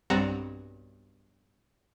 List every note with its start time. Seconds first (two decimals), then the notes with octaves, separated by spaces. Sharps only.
0.10 B1 G2 G3 C4 F#5 A#5